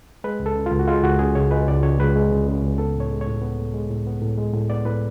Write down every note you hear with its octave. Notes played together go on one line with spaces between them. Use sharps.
G#3 B4
C#2
A4
C#3
F4
C#2
F#4
G#3 F4
C#2 F#4
C#3 G#4
C#2 C#5
G#3 B4
C#2 D5
C#3 C#5
C#2 B4
G#3
C#2
C#3
C#2
B3 A4
A2 C#5
G#3
C#5
A2
B3
A2
G#3
A2
B3
A2
G#3
A2
B3 D5
A2 B4